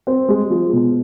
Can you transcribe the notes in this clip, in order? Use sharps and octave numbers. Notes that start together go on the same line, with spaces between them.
C4
G#3
F3
B2